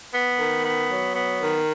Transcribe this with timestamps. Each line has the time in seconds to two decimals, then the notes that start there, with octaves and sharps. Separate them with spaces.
0.14 B3
0.39 D#3
0.65 B3
0.91 F#3
1.16 B3
1.41 D#3